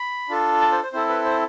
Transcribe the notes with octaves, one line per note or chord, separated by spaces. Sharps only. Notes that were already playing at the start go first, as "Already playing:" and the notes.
Already playing: B5
D4 F4 A4
A5
C5
C5
C4 E4 A4 C5
B4
C5